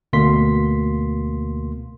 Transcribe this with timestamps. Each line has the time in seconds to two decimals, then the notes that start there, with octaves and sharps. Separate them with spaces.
0.13 D2 B2 A#3 C6 B6